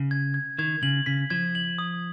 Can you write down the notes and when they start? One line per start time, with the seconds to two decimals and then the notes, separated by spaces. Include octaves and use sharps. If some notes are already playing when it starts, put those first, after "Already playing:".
Already playing: C#3
0.11 G#6
0.34 G#6
0.59 D#3 G#6
0.83 C#3 F#7
1.06 C#3 B6
1.30 F3 G#6
1.55 F#7
1.78 D#6